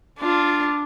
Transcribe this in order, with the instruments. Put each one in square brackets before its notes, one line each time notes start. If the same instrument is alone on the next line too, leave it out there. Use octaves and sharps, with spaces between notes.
[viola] D4 F4